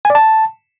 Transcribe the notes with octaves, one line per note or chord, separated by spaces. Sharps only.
G#5
D5
A5